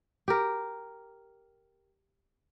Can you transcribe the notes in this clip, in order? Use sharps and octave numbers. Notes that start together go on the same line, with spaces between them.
G4 A#4